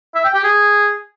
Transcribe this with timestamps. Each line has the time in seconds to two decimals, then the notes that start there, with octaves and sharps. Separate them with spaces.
0.15 E5
0.25 G5
0.35 G4
0.44 G#4